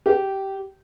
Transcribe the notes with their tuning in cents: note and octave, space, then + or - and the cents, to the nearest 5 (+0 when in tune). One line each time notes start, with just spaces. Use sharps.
G4 -15